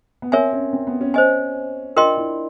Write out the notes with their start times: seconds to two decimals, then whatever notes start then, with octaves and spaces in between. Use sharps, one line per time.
0.22 B3
0.32 C4 A#4 C#5 E5 G#5
0.53 C#4
0.73 C4
0.87 B3
1.01 C#4
1.14 C5 D#5 G#5
1.97 D4 F4 A#4 D#5 G5 C6
2.17 E4